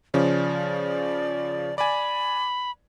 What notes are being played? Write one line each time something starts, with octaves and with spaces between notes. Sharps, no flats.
C#3 F3 C#4 D5
D5 G#5 B5